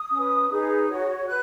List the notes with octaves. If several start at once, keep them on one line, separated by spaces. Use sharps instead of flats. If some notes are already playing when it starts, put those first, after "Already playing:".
Already playing: D#6
C#4 B4
D#4 G#4 B4
F#4 C#5
B4 F#6